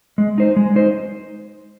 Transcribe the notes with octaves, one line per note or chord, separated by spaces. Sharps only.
G#3
D#4 C5
G#3
D#4 C5